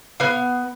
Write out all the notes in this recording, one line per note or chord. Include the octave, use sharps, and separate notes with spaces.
B3 F5